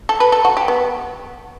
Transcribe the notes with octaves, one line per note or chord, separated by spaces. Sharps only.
A4
B4
A4
F#4
G4
B3